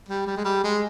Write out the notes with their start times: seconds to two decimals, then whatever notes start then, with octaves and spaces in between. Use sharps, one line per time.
0.09 G3
0.27 G3
0.36 G#3
0.45 G3
0.64 G#3